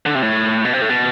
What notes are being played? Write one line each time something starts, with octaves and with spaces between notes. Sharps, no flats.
D3
C3
A2
B2
C3
A2
B2